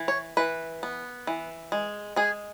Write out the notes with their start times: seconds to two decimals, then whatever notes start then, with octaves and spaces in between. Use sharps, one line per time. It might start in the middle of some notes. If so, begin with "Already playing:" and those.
Already playing: E3
0.08 C#5
0.37 E3 B4
0.83 B3
1.27 E3
1.72 G#3
2.16 G#3 G#4